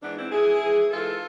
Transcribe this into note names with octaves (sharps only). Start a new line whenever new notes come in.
G#2 E3 B3 D4
C4 E4
G#2 E3 E4 G#4
G#2 E3
G#2 E3 F4 A4